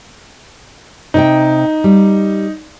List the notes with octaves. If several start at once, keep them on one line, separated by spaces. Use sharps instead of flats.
C3 D#4 D#5 G5
G3